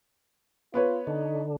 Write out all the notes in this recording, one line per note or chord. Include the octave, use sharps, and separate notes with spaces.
B3 F4 B4 C#5
D3 D#4